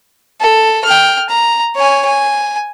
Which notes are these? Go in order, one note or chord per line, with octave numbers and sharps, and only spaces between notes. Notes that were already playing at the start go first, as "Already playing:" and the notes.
A4
G5 F6
A#5
C#5 G#5
G#5